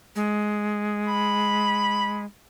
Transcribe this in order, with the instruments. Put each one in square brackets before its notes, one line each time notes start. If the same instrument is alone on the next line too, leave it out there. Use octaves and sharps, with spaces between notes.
[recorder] G#3
[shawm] B5